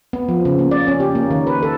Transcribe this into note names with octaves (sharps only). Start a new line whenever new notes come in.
B3
F3
C#3
A#3
D5
C#4
G4
A#3
D#3
B4
A4